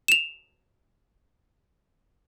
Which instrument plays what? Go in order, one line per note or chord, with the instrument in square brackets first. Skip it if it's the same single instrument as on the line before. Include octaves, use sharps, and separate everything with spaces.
[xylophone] E7 F7